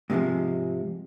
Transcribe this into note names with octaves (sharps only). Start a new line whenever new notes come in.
G#2 C3 E3 F3 G#3